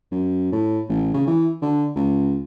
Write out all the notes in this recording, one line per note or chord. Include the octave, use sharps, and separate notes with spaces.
F#2
A2
A1
C#3
E3
D3
C#2